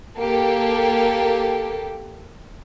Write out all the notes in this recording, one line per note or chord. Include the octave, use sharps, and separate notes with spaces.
A#3 G4 A4